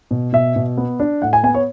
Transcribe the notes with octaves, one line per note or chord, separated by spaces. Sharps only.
B2
B2 E5
B2
B3
D4
A2 F#5
G#5
B3 G#5
C#5